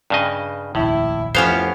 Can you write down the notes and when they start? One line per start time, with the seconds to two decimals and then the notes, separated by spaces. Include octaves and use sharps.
0.10 G2 C#3 D#5
0.75 F1 A#1 D#2 A2 E4
1.35 F2 A2 F3 B3 C#4 G4 C5 F5